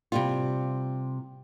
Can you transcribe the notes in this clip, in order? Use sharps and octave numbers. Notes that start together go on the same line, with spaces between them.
C3 G3 F4